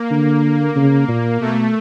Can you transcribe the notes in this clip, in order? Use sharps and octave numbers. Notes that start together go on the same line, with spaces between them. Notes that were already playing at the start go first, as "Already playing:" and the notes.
Already playing: A#3
D3
C#3
A#2
B2 A3